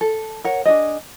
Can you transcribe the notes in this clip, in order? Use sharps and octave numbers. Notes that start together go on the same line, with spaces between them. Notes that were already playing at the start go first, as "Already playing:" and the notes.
A4
A#4 C#5 F#5
D4 D#4 G#4 D#5